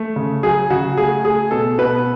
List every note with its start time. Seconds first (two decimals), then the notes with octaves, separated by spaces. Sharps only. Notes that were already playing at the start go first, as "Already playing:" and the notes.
Already playing: A3
0.16 C#3
0.43 F#3 G#4
0.70 C#3 F#4
0.97 A3 G#4
1.24 A3 G#4
1.51 B2 A4
1.78 B2 B4